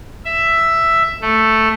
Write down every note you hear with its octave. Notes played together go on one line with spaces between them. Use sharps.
E5
A3